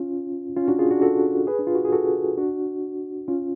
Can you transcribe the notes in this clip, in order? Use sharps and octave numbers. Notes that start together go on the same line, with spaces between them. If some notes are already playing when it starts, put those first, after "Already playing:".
Already playing: C#4 F4
C#4 F4
D4 F#4
F4 G#4
D4 F#4
F#4 A4
G#4 B4
D4
F4
F#4
G#4
F#4 A4
D4 F#4
C#4 F4